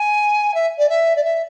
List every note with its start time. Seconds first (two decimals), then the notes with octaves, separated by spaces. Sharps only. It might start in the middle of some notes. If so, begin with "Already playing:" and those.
Already playing: G#5
0.54 E5
0.78 D5
0.89 E5
1.16 D5
1.23 E5